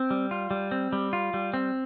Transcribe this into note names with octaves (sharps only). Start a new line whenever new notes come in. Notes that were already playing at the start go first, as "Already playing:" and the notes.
Already playing: C4
G3
F4
G3
C4
G3
F4
G3
C4